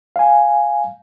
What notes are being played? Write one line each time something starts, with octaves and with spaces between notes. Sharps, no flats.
F5 G#5